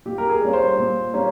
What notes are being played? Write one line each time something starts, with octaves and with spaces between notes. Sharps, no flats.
A#2 G4
A#4
G#4
G3 A#3 C#4
C5
A#2
G3 A#3 C#4